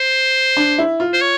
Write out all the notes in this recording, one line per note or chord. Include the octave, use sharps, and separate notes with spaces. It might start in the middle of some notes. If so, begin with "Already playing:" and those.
Already playing: C5
D4
E4
F4
C5
C#5